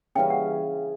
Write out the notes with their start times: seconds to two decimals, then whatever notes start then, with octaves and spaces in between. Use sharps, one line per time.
0.15 C#3 E3 G3 C#4 G5
0.30 F#5